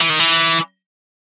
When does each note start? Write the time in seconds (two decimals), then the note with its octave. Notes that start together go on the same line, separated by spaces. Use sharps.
0.01 E3
0.10 D#3
0.19 E3